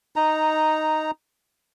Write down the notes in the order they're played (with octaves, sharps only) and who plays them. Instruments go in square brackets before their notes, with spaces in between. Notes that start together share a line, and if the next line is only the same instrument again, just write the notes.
[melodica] D#4 A#5